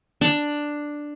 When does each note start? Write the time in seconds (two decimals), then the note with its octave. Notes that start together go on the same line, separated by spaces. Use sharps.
0.21 D4